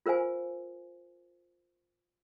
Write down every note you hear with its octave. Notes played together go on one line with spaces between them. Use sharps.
F4 A#4 C5 F5 G#5